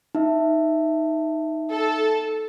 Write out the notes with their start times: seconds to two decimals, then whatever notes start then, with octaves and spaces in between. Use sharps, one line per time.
0.15 D#4 E5
1.71 A4